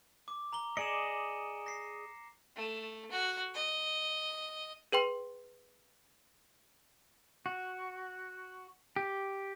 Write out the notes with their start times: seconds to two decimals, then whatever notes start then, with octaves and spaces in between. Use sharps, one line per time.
0.28 D6
0.53 A#5 F#7 G7
0.77 G#4 D5 D#5 C#7 E7
1.66 A#6 C7
2.56 A3
3.11 F#4
3.54 D#5
4.92 G#4 B4 G5 C6
7.46 F#4
8.96 G4